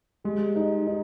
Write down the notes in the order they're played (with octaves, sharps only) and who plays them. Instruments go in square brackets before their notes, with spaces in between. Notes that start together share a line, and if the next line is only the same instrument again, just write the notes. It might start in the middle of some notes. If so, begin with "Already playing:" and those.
[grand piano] G3 [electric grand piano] G#3
[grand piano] D#4
D#4